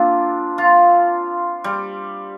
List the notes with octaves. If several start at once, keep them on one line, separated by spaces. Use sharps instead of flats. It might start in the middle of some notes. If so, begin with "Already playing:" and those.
Already playing: A#3 C4 D4 F4
F4
G3